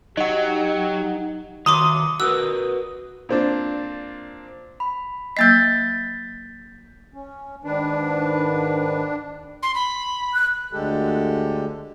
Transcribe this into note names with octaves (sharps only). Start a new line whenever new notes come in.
F#3 D#4 G4 D#5 F#5
D#3 F#3 F4 A#5 C6 D6 D#6
F#4 A#4 B4 E6
A#2 C4 D4
B5
F#3 A#3 D#5 G6 A6 B6
C#4
G#2 D#3 D4 B4
C6
B5
F#6
D2 D3 G#3 G4 A4